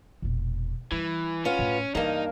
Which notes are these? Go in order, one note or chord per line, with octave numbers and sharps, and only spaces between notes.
E1 A#2
E3 G3
B3 C#4 F4
A2
G2 E3 A#3 D#4